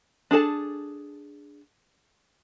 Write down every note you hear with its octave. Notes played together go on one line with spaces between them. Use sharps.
D4 G#4 A4 A5